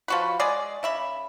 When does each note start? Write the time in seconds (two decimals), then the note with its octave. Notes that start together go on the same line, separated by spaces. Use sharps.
0.08 F3 F#4 B4
0.39 G#3 G#4 D5
0.83 C#3 E5 B5